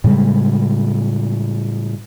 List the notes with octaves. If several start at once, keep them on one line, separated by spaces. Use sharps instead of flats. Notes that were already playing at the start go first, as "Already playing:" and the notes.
A2 C#3 G3 G#3